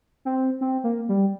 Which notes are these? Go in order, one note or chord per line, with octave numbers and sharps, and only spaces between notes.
C4
C4
A#3
G3